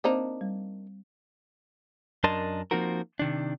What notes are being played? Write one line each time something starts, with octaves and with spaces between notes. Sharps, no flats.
A#3 C4 D4 D#4 C5
G3
F#2 D4 A#4 D#5 A5 C6
F3 A#3 C4 D#4 F#4 A#4
C3 D#3 D4